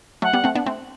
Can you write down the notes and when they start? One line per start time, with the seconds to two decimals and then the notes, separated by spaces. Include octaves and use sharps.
0.22 F#3 A3 F#5
0.33 G3 B3
0.44 A3 C4
0.55 B3 D4
0.66 A3 C4